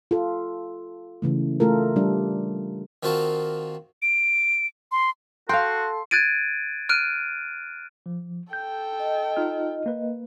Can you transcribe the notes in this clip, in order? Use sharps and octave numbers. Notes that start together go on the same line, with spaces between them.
F4 A4
C#3 E3 A3
A3 F4 A4 A#4
G3 D4
D#3 A#3 C4 F4 F#4 A5
D7
C6
F#4 A4 F5 G5 C6
F#6 G#6 A6 D7 D#7
F6 F#6 D7 D#7
F3
A4 G5 G6
D#5
D#4 F4 F6
A#3 B4